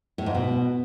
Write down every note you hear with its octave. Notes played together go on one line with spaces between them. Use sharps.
A2
G#2
B2